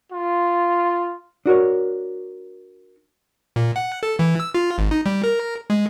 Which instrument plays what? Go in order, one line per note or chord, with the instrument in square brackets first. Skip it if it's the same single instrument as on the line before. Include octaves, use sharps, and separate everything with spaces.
[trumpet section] F4
[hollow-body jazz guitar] D4 F#4 A#4 C#5
[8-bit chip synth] A#2
F#5
A4
E3
E6
F4
G#1
D#4
G3
A#4
G#3